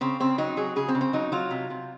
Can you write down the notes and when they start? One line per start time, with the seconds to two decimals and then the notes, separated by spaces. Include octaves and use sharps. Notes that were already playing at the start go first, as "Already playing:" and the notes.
0.01 C#3 C4
0.20 C#3 C4
0.38 F#3 D#4
0.57 F#3 G#4
0.76 C#3 G#4
0.89 C4
0.95 C#3
1.01 C4
1.13 F#3 D#4
1.32 F#3 F4
1.51 C3
1.70 C3